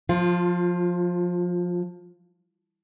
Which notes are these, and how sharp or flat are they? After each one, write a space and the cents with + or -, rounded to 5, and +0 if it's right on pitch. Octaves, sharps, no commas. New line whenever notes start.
F3 +20 F4 -5